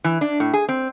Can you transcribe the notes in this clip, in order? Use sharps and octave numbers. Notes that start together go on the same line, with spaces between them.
E3
D4
A2
G#4
C4